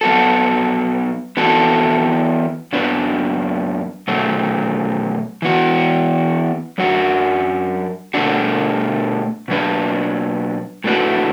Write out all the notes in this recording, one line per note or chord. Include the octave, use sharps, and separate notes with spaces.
F#3 B3 F#4 A4
E3 B3 F#4 A4
F#2 F#3 B3 D4 B4
B2 F#3 A3
E3 B3 F#4
F#2 F#3 D4 F#4
B2 A3 D4 F#4
B2 F#3 D4 B4
A2 A3 D4 F#4 B4